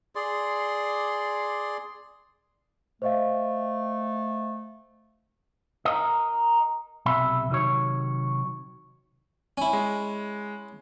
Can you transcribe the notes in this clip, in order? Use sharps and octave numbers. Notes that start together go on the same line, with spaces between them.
G#4 D5 C6
A3 C5 D#5 F5
A#4 D#5
B1 C3 E5 B5
C3 D#3 F#3 C#5
C#4 E4
G#3